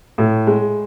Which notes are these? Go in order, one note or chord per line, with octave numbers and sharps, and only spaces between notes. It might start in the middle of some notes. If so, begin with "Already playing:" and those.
A2
G#3